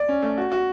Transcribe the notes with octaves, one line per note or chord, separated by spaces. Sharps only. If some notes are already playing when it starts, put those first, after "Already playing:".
Already playing: D5
C#4
A3
F#4
F#4